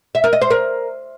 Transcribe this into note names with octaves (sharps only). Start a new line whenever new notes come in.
E5
A#4
D#5
C5
A#4